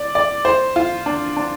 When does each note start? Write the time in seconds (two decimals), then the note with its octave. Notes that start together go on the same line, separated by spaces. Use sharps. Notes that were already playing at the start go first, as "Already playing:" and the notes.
Already playing: D5
0.15 D5
0.45 C5
0.76 F4
1.06 D4
1.37 D4